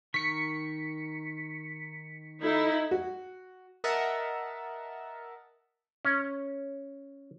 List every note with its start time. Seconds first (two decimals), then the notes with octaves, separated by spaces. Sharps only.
0.14 D#3 A#4 C#6 B6 C#7
2.42 D#4 E4 A4
2.91 F#4
3.84 A#4 D#5 E5 F#5 A5
6.05 C#4